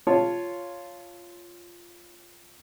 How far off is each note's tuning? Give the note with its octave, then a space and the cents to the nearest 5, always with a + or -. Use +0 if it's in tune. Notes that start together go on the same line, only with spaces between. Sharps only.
F4 -5 C#5 +0 A5 +0